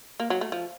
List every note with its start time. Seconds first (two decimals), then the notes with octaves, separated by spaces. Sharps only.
0.20 A#3
0.30 F#3
0.41 A3
0.52 F3